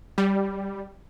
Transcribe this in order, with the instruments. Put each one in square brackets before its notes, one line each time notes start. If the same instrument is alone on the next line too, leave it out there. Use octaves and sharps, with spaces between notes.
[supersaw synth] G3